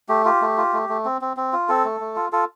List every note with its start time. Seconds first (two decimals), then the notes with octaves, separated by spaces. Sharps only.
0.09 A3 G4
0.25 F4 G4
0.42 A3
0.57 F4
0.73 A3
0.89 A3
1.05 C4
1.21 C4
1.37 C4
1.53 F4
1.69 C4 A4
1.84 A3
2.00 A3
2.16 F4
2.32 F4 A4